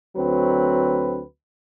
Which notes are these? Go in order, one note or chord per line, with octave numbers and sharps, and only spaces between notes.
D2 F#3 C4 B4